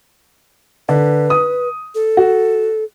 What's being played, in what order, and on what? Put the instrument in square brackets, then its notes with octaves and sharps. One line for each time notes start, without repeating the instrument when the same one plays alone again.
[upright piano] D3 [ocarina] B4
[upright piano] D#6
[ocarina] A4
[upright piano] F#4